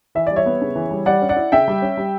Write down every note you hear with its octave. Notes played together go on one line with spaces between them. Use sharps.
E3 E5
G3 D5
C#5 E5
B3
C#3
E3
G3
G3 D5 F#5
C#4
D5 F#5
E4
C#3 E5 G5
G3
C#4
G3